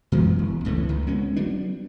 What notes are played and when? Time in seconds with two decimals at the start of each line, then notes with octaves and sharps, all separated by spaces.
0.12 F#2 E3 G#3 B3
0.39 E1
0.65 C#2 A2 E3 A3
0.89 C#2 D#3
1.07 G#3 B3 C#4
1.36 F#3 G3 B3 D4